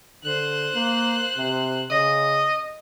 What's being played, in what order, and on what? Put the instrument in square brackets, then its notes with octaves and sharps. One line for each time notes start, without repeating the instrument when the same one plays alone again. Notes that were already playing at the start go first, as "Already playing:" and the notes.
[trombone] D3 [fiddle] C5 F#6
[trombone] A#3
C3
[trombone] C#3 [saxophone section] D#5